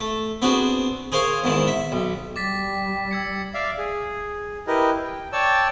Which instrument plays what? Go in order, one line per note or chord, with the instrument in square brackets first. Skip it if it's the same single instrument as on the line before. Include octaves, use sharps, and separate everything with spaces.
[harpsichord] A3
B3 C4 D4 F#4 G#4
G#4 A#4 C5 C#5 F5
E2 G#2 D#3 E3
E5
B1
[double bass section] G3 [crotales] D6 A6 B6
[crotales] E6 G#6 C#7
[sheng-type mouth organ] D5 E5 F5
G#4
E4 G4 A#4 B4 D#5
G5
C#5 D5 G5 A5 E6